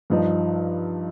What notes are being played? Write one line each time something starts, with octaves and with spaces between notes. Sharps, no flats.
G2 F3 D#4